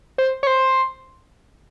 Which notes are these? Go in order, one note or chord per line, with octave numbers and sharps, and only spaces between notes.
C5
C#5
C5